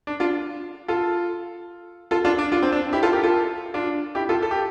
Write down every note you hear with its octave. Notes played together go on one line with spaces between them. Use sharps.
D4
D4 F4
F4 A4
F4 A4
D4 F4
D4
D4 F4
C4
D4
E4 G4
F4 A4
G4 A#4
F4 A4
D4 F4
E4 G4
F4 A4
A4
G4